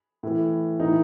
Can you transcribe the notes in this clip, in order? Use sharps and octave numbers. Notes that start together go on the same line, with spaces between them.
A2 E3
A2 E3 D#4